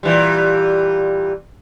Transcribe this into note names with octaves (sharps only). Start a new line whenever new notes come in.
A#2 E3 G3